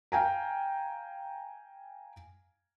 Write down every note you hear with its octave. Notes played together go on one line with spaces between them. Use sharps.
F5 G5 G#5 A#5